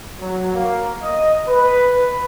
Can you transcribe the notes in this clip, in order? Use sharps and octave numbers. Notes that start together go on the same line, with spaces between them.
F#3
A#3
D#5
B4